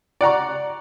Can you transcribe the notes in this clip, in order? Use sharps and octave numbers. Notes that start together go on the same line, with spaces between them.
D5 F#5 A#5 C#6